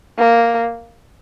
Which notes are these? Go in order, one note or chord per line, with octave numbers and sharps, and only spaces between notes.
A#3